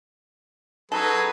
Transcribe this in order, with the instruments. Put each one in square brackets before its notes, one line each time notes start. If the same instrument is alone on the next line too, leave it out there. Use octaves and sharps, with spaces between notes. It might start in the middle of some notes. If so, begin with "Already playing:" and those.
[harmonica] F#3 G#4 B4 [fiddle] D#4 [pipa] A4